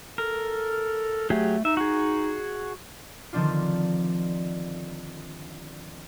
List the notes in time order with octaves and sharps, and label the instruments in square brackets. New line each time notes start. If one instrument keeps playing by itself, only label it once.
[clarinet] A4 [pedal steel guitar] A#4
[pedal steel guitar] F#3 G4 G#4 [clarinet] A3
[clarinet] D#4 [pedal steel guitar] E5
[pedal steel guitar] F#4 G#4
[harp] D3 D#3 F3 C4 D4 F4